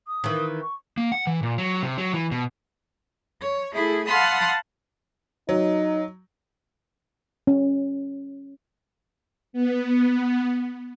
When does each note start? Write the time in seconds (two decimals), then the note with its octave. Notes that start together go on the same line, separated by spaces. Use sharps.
0.07 D#6
0.24 D#3 E3
0.62 C#6
0.97 A#3
1.12 F#5
1.27 E3
1.43 A#2
1.58 F#3
1.83 C3
1.98 F#3
2.13 E3
2.31 B2
3.42 C#5
3.73 A3 E4 G#4
4.06 F5 F#5 A5 B5 C6 D#6
5.49 F#3 D#4
7.47 C#4
9.53 B3